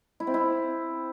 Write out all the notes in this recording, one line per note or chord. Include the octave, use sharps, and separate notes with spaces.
E4
C4
E4